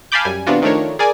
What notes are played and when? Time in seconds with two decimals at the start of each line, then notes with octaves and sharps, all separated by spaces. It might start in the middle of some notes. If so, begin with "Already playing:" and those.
0.12 F5 G#5 A5 B5 D6 G6
0.25 F#2 G3 G#5
0.47 C3 E3 B3 D4 F4 F#4
0.62 D#3 F3 A3 D4 A#4 C#5
0.99 G#4 A#4 D5 G#5